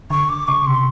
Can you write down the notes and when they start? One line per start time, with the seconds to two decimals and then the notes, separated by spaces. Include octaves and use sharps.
0.10 D3 C#6
0.29 D6
0.48 C#3 C#6
0.66 C3 C6